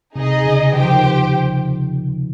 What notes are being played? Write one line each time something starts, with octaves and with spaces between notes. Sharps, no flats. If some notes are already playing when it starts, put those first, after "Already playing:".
C3 D#4 G#4 D#5
C#3
D#3 G4 C5 G5
F3
D#3